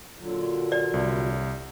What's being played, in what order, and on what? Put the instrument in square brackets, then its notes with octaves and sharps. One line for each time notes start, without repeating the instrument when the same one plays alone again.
[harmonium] A#2 D3 F#3
[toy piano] D5
[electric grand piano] C2